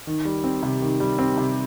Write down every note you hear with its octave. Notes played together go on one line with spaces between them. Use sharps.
D#3
G3
C4
C3
D#3
G3
C4
C3